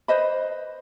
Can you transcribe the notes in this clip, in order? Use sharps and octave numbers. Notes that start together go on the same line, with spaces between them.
B4 C5 D#5 B5